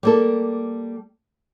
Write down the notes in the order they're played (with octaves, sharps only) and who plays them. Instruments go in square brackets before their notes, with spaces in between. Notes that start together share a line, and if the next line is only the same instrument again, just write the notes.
[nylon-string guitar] G3 A#3 A4